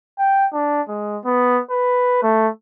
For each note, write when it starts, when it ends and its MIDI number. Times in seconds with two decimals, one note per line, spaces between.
0.19 0.47 79
0.53 0.81 62
0.89 1.18 56
1.25 1.60 59
1.70 2.20 71
2.23 2.49 57